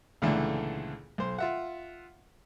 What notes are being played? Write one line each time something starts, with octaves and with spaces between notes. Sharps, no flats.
C#2 A#2 D3 E3 A3
B1 C5
F4 E5 F#5